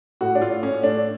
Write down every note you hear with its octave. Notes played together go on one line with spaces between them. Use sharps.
A2 F#4
D4
A2 F4
A2 C#4
A3 D4